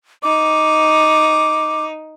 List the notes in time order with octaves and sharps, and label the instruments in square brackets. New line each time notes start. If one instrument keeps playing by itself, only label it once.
[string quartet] D#4 [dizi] D6